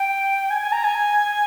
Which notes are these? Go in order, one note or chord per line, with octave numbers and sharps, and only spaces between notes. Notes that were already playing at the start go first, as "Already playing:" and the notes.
Already playing: G5
G#5
G#5
A#5
G#5